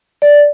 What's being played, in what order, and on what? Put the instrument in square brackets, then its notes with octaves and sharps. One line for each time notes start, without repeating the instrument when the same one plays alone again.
[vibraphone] D5